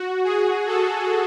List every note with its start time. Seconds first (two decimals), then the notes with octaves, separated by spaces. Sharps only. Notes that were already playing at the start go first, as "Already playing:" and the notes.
Already playing: F#4
0.24 G#4
0.66 A4